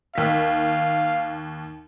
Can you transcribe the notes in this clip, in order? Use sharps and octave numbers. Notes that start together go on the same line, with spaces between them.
D#2 F5 B6